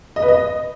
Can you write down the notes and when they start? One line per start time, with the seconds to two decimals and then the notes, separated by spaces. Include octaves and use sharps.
0.16 D#5
0.22 B4
0.28 D#5